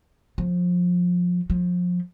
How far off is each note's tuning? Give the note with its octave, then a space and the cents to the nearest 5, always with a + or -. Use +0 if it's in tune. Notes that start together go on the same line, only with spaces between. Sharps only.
F3 +25
F3 +30